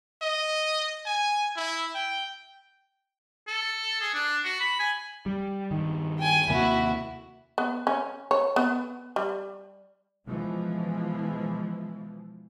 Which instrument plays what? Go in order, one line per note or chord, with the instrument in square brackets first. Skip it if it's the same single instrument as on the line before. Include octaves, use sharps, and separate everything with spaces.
[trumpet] D#5
G#5
E4
G5
[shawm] A4
G#4
D4
F#4
B5
G#5
[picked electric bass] G3
G2 D#3
[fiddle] G5 G#5
[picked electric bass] D#2 C3 A#3 [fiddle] E4 F#4
[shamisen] B3
C#4
C#5
B3
G3
[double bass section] B2 E3 F3 G#3